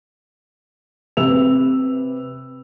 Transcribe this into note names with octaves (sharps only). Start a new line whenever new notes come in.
C3 G4 B4 E6 F7